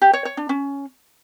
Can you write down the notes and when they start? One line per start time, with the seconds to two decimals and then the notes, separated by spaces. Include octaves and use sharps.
0.02 G4
0.13 C#5
0.25 C#5
0.37 D4
0.49 C#4